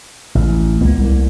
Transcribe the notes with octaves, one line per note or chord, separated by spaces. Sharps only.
A1
C#2 A#3 B3
C2